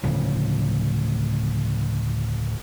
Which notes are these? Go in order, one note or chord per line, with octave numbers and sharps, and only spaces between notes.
D1 C#3 F3